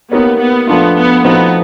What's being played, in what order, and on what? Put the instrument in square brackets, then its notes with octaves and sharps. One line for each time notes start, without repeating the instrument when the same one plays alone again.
[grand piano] A#3 D#4 G4 A#4 C#5 [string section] B3
[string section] B3
[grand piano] F3 A3 D4 F4 [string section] B3
[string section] B3
[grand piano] F3 A3 C4 D#4 F#4 [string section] B3